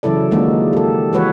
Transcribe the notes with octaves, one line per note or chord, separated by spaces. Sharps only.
C#3 E3 F#3 E4 A4 D5
D#3 F3 G#3 A#3 D4 F#4
G4 A4
E3 G#3 F#4 B4 C#5 F#5